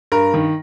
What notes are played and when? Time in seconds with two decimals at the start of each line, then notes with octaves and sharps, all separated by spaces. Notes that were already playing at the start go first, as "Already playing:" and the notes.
0.12 G2 A#4
0.34 D#3